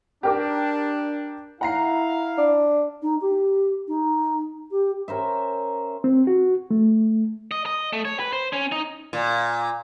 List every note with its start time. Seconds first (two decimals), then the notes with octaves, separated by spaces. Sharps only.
0.23 D4 G4 A#4 D6
1.61 E4 F5 F#5 A#5 C7
2.38 D4
3.02 D#4
3.21 G4
3.88 D#4
4.71 G4
5.08 C#4 A#4 C5 E5
6.04 C4
6.27 F#4
6.71 A3
7.51 D#5
7.66 D#5
7.93 A3
8.05 C#5
8.20 B4
8.33 C5
8.53 C#4
8.72 D#4
9.13 A#2